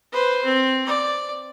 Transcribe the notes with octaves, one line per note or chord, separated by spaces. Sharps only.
B4 C5
C4
D5